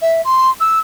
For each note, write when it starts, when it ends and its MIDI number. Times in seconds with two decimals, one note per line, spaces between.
0.01 0.21 76
0.24 0.50 84
0.60 0.79 88